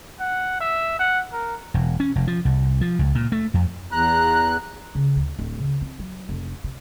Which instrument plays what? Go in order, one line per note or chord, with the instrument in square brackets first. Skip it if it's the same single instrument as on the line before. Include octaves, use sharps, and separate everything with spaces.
[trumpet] F#5
E5
F#5
A#4
[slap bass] E1
C#4
F1
F3
C2
F3
C#2
A#2
A3
F2
[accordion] E2 F#6 [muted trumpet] A#5
[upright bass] C#3
D2
D1
C#3
C4
F#3
F1
C3